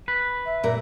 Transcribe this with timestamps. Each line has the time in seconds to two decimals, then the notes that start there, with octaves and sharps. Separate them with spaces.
0.08 B4
0.45 E5
0.63 A#2 A#4